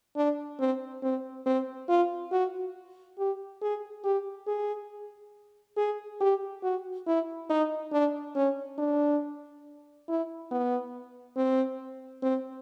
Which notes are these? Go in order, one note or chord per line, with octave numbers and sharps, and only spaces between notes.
D4
C4
C4
C4
F4
F#4
G4
G#4
G4
G#4
G#4
G4
F#4
E4
D#4
D4
C#4
D4
E4
B3
C4
C4